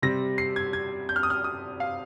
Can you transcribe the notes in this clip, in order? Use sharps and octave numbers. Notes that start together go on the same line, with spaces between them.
C3 G3 C4 A#6
C7
G#6
G#6
G6
F6
D#6
F6
D#6
F5